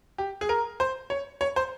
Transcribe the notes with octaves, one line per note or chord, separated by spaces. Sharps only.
G4
G#4
A#4
C5
C#5
C#5
C5